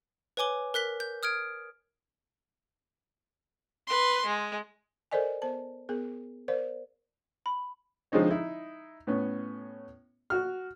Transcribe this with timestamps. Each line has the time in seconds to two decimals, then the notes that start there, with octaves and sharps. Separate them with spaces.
0.37 B4 C#5 G#5 D6 G7
0.74 A#4 F#6 B6 G7
1.00 G6
1.23 D#6 F6 G#6 D7
3.87 B4 C6
4.26 G#3
5.11 A4 A#4 C5 D5 D#5 G#5
5.42 B3 C5 A5
5.89 B3 G#4 A#4
6.48 A#4 C5 D5 F5
7.46 B5
8.12 D3 F3 G#3 C4 D#4 C#5
8.31 D#4 E4
9.07 A2 B3 C#4
10.30 F#4 F6